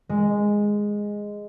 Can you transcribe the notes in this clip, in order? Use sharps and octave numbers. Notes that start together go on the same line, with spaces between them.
G#3